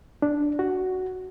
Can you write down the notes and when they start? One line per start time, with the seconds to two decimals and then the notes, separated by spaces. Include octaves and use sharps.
0.22 D4
0.59 F#4